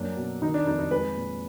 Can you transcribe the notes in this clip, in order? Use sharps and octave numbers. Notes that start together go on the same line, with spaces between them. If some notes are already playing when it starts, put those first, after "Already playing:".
Already playing: F#2 A#3 D4
B2
D#3 D#4
D4
F2 D#4
D#4
G#3 B4
A#2